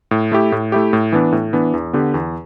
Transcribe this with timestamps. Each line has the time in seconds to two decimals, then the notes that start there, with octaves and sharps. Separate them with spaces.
0.11 A2
0.32 A3 E4 G4
0.52 A2
0.72 A3 E4 G4
0.93 A2
1.12 E3 B3 D4
1.32 A2
1.53 E3 B3 D4
1.74 E2
1.93 D3 B3 G4 B4
2.14 E2